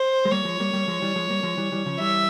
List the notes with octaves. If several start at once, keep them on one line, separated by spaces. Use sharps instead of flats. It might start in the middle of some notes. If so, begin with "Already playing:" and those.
Already playing: C5
G#3
G3 A#3 C#5
F3 G#3
G3 A#3
G3 A#3
F3 G#3
E3 G3
F3 G#3
G3 A#3
F3 G#3
E3 G3
E3 G3
C#3 F3
E3 G3 E5